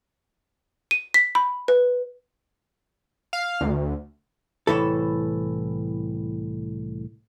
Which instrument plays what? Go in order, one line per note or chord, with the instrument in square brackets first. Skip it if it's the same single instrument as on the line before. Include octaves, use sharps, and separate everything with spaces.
[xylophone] D#7
B6
B5
B4
[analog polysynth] F5
D2
[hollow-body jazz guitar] C2 A2 E3 A4